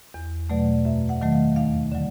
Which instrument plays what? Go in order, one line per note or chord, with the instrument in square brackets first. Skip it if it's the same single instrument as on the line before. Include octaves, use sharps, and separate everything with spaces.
[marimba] E2
B2 F#3 A3 D5
F#2 E5
F#5
D#3 F#3 A3
F5
D#2 F5
D3 F#3